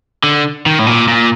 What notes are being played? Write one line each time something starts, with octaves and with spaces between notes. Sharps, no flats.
D3
D#3
A2
A#2
A#2